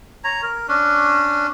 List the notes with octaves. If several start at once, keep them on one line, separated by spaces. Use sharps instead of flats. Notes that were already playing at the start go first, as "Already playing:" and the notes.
C#5 A#5
A#4
C#4 D4